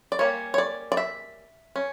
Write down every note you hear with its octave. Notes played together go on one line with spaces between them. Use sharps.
D5
G3 A#3 C#4 C#5
C#5
D5
D5
E5
C#4